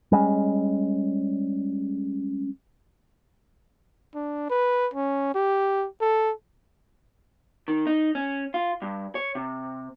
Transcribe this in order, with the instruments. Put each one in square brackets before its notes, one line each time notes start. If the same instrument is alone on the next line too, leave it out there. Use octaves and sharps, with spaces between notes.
[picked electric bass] G3 G#3 B3 C#4
[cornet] D4
B4
C#4
G4
A4
[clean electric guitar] D#3
D#4
C#4
F4
G2
C#5
C3